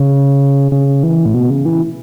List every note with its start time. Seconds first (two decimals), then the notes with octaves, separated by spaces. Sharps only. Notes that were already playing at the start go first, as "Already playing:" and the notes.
Already playing: C#3
0.72 C#3
1.03 E3
1.26 A2
1.34 B2
1.50 C#3
1.66 E3